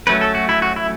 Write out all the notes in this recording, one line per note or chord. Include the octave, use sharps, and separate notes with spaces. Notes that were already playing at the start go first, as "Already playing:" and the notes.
F#3 A3 C#4 B4
A4
F#4
E4
F#4
E4